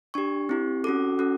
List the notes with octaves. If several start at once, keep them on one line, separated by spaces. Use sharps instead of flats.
D4 G4 C#6
C4 E4 G4
C#4 F#4 A4 D6
C#4 F#4 A4